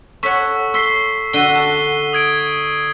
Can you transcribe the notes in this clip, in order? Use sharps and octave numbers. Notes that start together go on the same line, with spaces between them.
A4 C#5 F#5 C#6 B6
C6 E6 B6 C7
D3 F#4 D#7 G7
A5
D#6 G#6 D7